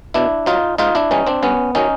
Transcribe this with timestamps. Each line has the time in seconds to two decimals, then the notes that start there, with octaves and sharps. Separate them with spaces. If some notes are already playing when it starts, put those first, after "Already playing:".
0.14 B2 D4 E4
0.46 F#3 D#4 F4
0.78 G#2 D#4 F4
0.95 D4 E4
1.11 E3 G3 C#4 D#4
1.27 C4 D4
1.43 G2 B3 C#4
1.75 D#3 F#3 C#4 D#4